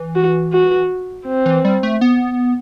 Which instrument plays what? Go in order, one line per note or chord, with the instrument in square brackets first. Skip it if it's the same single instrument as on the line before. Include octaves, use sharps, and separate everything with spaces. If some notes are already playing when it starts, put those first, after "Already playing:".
Already playing: [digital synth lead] E3
[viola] F#4
F#4
C4
[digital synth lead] E3
G3
A3
B3